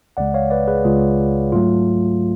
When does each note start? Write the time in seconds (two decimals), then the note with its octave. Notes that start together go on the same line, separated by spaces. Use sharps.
0.17 C#2 C#3 G#3 D5 F#5
0.34 C#5 F5
0.50 B4 D5
0.68 G#4 B4
0.84 C#2 C#3 G#3 F4 G#4
1.52 G#2 F#3 A3 F4